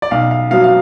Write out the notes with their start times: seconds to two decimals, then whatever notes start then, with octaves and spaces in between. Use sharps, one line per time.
0.02 D5
0.11 B1 F5
0.31 F5
0.51 B2 F#3 F5
0.64 F5